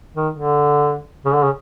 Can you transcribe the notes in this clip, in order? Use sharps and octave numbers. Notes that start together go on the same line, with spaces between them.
D#3
D3
C#3
D3
C#3